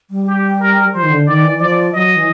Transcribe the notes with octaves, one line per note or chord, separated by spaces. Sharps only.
G3
G4
A#4
F3 C5
D#3
D3
D#3 D5
E3
F3 D5
F#3 D#5
E3